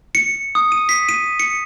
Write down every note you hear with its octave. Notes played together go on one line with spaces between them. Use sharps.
C#7
D#6
D#7
B6
D#7
C#7